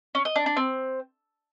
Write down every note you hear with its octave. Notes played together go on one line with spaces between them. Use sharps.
C#4
D#5
D4
D4
C4